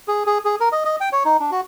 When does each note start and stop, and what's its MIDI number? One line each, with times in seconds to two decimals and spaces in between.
0.08 0.23 68
0.26 0.38 68
0.45 0.56 68
0.60 0.69 70
0.72 0.84 75
0.85 0.96 75
1.01 1.09 79
1.12 1.23 73
1.25 1.37 63
1.40 1.51 62
1.51 1.61 66